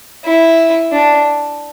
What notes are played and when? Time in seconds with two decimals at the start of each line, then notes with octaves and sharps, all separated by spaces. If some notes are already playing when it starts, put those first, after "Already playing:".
0.25 E4
0.92 D4